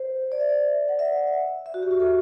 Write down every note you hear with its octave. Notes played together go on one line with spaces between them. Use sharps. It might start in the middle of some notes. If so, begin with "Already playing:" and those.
Already playing: C5
D5
E5
D5
F#5
E5
E5
F#4
G4
F#4
A4